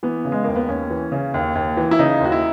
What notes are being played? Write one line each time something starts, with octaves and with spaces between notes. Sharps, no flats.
E3 B3
C#3
G#3
D#2 A#3
B3
D#2 C#4
E3
C#3
D#2
D#2
E3
E4
C#3 D#4
D#2 F#4
E4